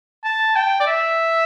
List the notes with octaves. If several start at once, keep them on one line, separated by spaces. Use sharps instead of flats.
A5
G5
D5
E5